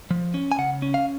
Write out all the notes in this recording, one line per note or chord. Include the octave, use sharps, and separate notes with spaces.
F3
C#4
G#5
C#3 F#5
C#4
F5